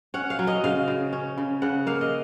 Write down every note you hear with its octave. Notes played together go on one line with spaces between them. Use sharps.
C#4 F#5
F5
F#3
D#5
C#3 F5
C#3
C#4
C#3
C#3 F#5
A#3 F5
D#5